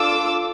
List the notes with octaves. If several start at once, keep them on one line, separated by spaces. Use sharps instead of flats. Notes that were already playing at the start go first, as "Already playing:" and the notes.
Already playing: D4 F4 A4 D6 E6